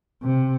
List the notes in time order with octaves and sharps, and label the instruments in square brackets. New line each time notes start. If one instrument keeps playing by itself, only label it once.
[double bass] C3